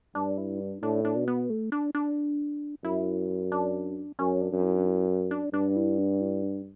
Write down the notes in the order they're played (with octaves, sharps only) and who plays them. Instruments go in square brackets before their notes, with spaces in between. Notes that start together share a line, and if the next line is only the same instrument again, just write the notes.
[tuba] G2 [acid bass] D4
[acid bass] E4
D4
[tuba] A2 [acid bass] D4
[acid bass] D4
[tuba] B2
[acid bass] B3
A3
D4
D4
[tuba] F#2 [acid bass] E4
[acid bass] D4
[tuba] F#2 [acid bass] C#4
[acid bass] D4
[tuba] F#2
[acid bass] E4
D4
E4
D4
[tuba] G2 [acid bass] D4
[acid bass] E4
D4
E4
D4